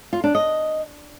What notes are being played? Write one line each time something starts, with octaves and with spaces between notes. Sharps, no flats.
F4
D4
D#5